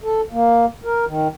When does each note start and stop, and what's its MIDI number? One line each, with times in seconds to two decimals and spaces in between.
0.04 0.21 69
0.32 0.66 58
0.84 1.05 70
1.07 1.28 51